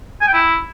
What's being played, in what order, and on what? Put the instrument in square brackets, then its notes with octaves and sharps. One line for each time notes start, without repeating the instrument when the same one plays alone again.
[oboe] G#5
G5
E4